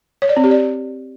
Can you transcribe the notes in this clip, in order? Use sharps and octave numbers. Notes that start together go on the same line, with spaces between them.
C#5
D5
C4
G4
D5